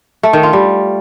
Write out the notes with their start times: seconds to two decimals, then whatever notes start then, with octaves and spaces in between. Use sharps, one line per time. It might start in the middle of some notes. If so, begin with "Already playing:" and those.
0.23 A3
0.33 D#3
0.43 F4
0.53 G3